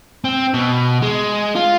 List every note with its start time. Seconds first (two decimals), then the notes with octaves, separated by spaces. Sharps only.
0.24 C4
0.54 B2
1.02 G#3
1.55 F4